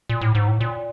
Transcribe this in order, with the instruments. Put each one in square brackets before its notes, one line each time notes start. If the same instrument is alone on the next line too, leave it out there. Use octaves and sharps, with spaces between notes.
[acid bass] A#2
A2
G#2
A2
A#2